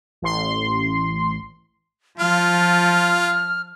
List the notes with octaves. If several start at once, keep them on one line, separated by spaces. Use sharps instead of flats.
A1 C6
F3 F4 F6